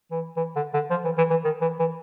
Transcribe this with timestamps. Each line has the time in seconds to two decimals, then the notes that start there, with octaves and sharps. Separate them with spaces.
0.11 E3
0.37 E3
0.56 D3
0.74 D3
0.90 F3
1.05 E3
1.18 E3
1.30 E3
1.44 D#3
1.61 E3
1.79 E3